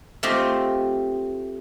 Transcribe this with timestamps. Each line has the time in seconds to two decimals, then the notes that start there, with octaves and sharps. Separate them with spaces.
0.23 A3 C4 F4 G4 D#5